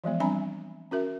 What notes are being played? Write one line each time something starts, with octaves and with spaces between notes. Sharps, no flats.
E3 F3 G#3 B3
G3 C4 D4 G#5 A#5 B5
C#4 F#4 A#4 E5